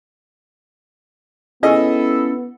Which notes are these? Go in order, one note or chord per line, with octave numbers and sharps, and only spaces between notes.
B3 C#4 E4 G#4 A4 D#5